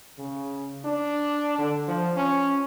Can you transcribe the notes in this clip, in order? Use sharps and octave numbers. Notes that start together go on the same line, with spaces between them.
C#3
D4
D3
F3
C#4